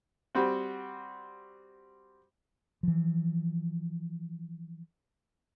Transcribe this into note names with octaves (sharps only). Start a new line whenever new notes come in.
G3 C4 F#4
E3 F3